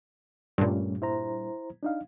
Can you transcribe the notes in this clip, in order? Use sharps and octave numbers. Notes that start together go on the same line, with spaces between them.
G2 A#2 G3 A3 C#4
E4 C5 A#5
D4 D#4 F5